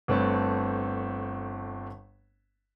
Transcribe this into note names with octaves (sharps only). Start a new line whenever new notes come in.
G1 A3 C4 B4 C#5 A5